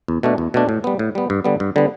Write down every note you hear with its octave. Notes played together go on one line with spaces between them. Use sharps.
E2
B2 A3 D4
E2
B2 A3 D4
A2
G3 B3
A2
G3 B3
G2
D3 G3 B3
G2
D3 G3 B3